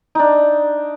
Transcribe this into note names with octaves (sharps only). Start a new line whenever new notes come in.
D4 D#4